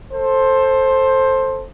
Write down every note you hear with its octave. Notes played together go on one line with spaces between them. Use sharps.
A4 C5